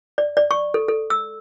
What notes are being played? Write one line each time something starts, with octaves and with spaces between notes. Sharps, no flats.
D5
D5
C#6
A4
A4
E6